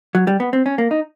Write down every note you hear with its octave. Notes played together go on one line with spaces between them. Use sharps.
F#3
G3
B3
C4
C#4
A#3
D#4